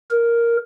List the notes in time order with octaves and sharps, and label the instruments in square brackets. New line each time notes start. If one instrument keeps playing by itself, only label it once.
[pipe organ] A#4